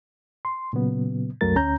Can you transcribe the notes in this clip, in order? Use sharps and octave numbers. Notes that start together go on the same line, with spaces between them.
C6
A#2 C#3 F#3 B3
C2 F#2 F#3 A3 A#4 A6
D2 C#4 A#5 G6